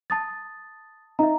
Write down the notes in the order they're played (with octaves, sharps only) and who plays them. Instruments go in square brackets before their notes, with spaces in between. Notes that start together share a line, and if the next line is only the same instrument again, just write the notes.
[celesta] A5 D#6 A6
[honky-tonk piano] D#4 [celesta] E5 A#5